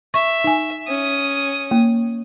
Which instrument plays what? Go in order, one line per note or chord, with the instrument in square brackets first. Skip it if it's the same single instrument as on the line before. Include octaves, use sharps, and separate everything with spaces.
[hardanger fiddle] E5 [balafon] C#6
[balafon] D#4 G#5
[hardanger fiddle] C#4 D#6
[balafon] A#3